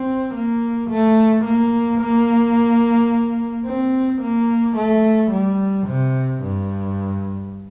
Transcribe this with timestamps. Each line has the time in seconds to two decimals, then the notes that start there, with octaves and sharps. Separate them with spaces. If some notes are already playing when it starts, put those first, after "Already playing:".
Already playing: C4
0.34 A#3
0.90 A3
1.44 A#3
2.00 A#3
3.66 C4
4.21 A#3
4.76 A3
5.31 G3
5.87 C3
6.42 G2